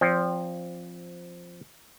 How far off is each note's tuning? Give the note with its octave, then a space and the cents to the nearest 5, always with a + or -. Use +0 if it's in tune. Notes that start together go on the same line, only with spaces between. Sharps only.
F3 +0 C4 +0 D5 -25